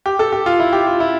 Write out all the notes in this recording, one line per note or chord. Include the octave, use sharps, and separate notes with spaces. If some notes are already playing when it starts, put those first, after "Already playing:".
G4
A4
G4
F4
E4
G4
F4
E4